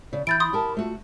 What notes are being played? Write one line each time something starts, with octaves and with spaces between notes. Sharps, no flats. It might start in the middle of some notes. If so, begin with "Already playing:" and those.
C#3 D5
E3 B5 G6 A6 D7
B5 C6 D#6
G4 A#4 A5
A3 F4 F#4